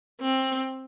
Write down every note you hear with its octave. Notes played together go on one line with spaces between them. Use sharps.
C4